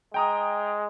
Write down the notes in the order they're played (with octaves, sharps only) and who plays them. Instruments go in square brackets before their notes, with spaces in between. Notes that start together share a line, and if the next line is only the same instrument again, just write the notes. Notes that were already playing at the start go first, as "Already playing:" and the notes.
[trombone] G#3 [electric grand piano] G5 A#5 D#6